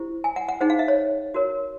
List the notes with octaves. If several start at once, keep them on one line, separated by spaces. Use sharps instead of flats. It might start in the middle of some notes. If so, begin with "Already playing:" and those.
Already playing: E4 G4 C5
G#5
F#5
F#5
D#4 G#4 C5 F#5
F5
E5
C#5
F#4 A#4 C#5